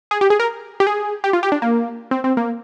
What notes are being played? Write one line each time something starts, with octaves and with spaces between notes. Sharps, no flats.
G#4
G4
G#4
A#4
G4
G#4
G4
F4
G4
D4
A#3
C4
C4
A#3